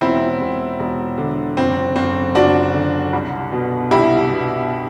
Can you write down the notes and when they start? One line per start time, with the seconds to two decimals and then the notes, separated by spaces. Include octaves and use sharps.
0.01 E1 C4 E4
0.40 E1
0.79 E1
1.18 D3
1.57 F#1 C4
1.96 F#1 C4
2.35 F#1 D4 F#4
2.74 D3
3.13 C2
3.52 B2
3.91 C2 E4 G4
4.30 B2